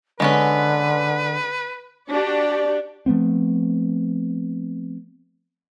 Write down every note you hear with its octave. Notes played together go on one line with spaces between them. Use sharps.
D3 G#3 B3 C#4 B4
D4 F#4 G4 D5
F3 A3 B3 C4